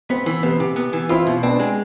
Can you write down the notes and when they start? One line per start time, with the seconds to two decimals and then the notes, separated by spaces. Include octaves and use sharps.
0.10 B3 C4
0.26 E3
0.43 C3 B3
0.60 C3
0.76 B3
0.93 E3
1.09 C4 E4 F4
1.27 B2
1.43 B3 C4 D4
1.60 G#3